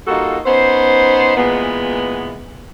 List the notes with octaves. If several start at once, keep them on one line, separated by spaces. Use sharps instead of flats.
G3 A#3 D#4 F4 F#4 A4
B3 C#4 D#4 C5
A#2 E3 G#3 B3